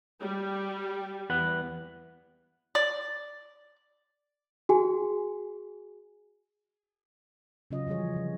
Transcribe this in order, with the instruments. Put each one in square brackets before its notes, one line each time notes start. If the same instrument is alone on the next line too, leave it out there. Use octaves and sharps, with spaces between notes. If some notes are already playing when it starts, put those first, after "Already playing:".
[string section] G3
[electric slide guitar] E2 B4 F#5
[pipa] D5
[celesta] F#4 G#4 G#5
[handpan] C#3 F#3 C#4 F4 D#5
E3 F3 G3 G#4 C#5
D3 F3